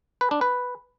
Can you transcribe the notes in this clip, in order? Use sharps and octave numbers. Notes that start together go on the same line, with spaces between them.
B4
D4
B4